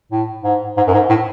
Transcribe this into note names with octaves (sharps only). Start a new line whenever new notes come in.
A2
G#2
G#2
F#2
G#2
A2